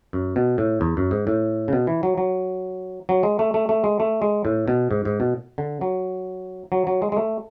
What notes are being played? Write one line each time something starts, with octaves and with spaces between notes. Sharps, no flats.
F#2
B2
A2
E2
F#2
G#2
A2
C#3
B2
E3
F#3
F#3
F#3
G#3
A3
A3
A3
G#3
A3
G#3
A2
B2
G#2
G#2
B2
D3
F#3
F#3
F#3
G#3
G#3
A3